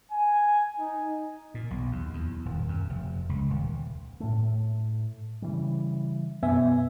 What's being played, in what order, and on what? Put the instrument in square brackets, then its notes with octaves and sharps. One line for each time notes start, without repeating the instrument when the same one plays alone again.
[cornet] G#5
D#4
[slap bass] A#2
B1
D#2
E2
D#1
F#2
F1
C#2
D#1
[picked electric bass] A2 A3
C#3 E3 G3
[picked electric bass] F#2 B2 [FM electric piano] B3 E5 G#5